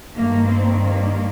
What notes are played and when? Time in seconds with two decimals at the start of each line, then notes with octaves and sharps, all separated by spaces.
0.14 G2 D#3 A#3
0.48 C4
0.81 A#3